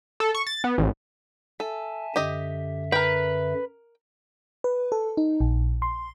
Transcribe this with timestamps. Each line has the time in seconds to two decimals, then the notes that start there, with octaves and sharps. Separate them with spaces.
0.20 A4
0.35 C#6
0.47 A6
0.64 B3
0.78 A1
1.60 A4 E5 G#5 A5
2.16 F#2 D3 G4 D#5 E5
2.92 A#4 B4 G5
4.64 B4
4.92 A4
5.17 D#4
5.41 A#1
5.82 C6